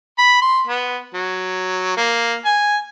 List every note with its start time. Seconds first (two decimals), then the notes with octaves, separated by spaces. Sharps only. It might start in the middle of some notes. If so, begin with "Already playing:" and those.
0.18 B5
0.42 C6
0.67 B3
1.14 F#3
1.97 A#3
2.45 G#5